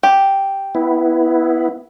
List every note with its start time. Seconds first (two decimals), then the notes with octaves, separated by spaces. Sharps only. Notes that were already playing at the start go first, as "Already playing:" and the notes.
0.03 G4
0.75 B3 E4